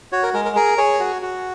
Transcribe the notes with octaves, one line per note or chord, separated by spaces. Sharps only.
F#4 C#5
A#4
G#3 A#4
A#4
G#4 A#4
G#4 C#5
F#4
F#4